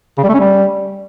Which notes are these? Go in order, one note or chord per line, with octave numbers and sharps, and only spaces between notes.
C#3
G3
A3
C#4
G3